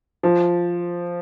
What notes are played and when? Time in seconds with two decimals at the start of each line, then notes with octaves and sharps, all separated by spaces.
0.23 F3